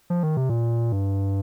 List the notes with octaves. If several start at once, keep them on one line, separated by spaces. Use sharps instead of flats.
F3
D#3
C3
A#2
G2